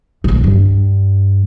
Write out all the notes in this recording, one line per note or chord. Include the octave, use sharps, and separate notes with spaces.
A#1 D3
G2